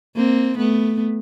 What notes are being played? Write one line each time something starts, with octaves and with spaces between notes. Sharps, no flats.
A#3 C4
A3 B3